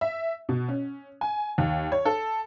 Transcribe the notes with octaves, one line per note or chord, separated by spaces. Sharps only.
E5
B2
C#4
G#5
D#2
C#5
A4